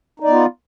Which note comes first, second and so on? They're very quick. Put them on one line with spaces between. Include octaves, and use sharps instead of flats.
D#4 D5 B3 F4